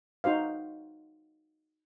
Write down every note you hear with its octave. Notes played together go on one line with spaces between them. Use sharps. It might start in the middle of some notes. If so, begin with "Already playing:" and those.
D#4 F#4 C5 F5